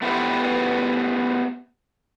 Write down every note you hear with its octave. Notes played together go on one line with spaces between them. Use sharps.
A3 B3 C4 E4 G4 B4